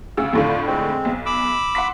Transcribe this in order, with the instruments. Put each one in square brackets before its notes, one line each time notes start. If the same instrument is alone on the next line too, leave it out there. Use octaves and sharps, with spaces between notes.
[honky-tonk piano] D2 C#3 E6
[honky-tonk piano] F2 A2 D3 [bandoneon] F4
[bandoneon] G#3 C4
[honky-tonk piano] B1
[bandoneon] B5 D6 E6
[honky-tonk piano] F#5 C6 B6